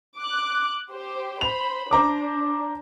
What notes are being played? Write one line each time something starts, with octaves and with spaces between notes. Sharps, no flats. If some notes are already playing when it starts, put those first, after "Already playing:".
D6 F#6
G4 C5
C5 B5 F7
D4 C5 A#5 D6